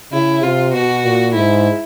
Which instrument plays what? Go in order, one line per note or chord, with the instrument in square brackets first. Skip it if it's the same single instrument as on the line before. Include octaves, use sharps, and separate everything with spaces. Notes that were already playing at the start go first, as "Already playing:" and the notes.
[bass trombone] C#3 [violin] E4
[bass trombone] C3 [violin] F4
[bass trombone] B2 [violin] F#4
[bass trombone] A#2
[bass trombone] G#2 [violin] E4